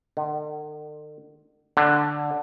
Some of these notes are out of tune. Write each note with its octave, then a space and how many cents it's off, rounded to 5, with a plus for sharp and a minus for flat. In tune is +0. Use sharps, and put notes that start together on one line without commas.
D3 +45
D3 +5